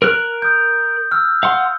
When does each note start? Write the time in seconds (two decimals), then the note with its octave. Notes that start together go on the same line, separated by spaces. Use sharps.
0.02 A#4 F6 F#6
0.42 D#6 G6
1.12 E6 F6
1.43 F5 F#5 C6